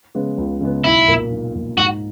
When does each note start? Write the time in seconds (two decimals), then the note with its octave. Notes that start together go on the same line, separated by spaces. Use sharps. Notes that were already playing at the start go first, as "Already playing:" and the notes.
0.15 C#3 G#3 B3
0.38 C#2
0.60 C#3 G#3 B3
0.84 B1 E4
1.08 A#2 A#3
1.31 B1
1.54 A#2 A#3
1.78 G#2 F#4